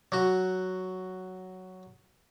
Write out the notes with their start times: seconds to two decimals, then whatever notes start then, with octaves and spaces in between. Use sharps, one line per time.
0.12 F#3 F#4